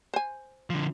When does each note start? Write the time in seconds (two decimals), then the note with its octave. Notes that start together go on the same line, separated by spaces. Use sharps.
0.14 C5 G#5
0.70 D3 F3